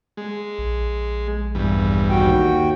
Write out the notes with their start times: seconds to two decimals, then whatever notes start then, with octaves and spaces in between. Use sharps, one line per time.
0.17 G#3
0.58 A#1
1.55 E2 G2
2.10 D#2 F#4 G5